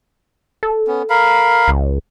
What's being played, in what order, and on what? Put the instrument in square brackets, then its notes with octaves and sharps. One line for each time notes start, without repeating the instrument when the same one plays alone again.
[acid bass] A4
[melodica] B3 C#4
A#4 F5 B5
[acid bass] C#2